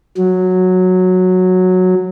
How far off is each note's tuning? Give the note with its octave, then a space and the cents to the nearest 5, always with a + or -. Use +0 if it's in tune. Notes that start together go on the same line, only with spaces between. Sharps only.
F#3 -10